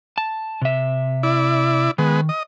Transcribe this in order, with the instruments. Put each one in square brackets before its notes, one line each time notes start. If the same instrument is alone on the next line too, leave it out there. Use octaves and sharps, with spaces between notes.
[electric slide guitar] A5
C3 E5
[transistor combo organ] E4 D5
[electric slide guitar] D#3 [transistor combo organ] G#3 B3
[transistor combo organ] D#5